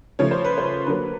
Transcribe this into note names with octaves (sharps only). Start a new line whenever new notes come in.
C#3 F3 A3 C#5
C5
B4
C5
D3 F#3 A#3 B4